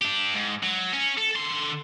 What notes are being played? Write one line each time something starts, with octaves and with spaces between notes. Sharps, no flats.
D4 G4
G#2
F#3
C#4
A4
D3 C6